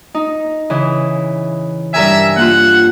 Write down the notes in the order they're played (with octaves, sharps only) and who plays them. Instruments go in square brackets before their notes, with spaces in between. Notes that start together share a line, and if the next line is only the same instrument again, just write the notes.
[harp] D#4
C#3 E3
[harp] G2 A#4 G#5 [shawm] E5
[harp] A#3 F4 [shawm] F#5